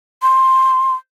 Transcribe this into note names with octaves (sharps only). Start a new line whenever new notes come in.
C6